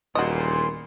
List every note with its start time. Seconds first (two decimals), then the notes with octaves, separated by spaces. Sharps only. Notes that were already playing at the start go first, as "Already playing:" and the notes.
0.15 D#1 E2 A#2 F#4 D#5 C6